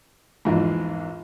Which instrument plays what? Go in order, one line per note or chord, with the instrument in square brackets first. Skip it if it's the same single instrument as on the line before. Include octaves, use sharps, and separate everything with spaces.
[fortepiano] A#1 E2 G#2